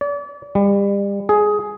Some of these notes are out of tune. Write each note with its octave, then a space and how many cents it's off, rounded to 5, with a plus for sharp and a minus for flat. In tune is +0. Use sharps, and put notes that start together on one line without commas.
D5 -35
G3 +35
G#4 +10